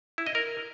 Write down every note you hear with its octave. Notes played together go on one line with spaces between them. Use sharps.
E4
D#5
A#4